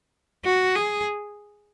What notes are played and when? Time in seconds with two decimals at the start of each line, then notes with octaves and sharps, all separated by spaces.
0.45 F#4
0.76 G#4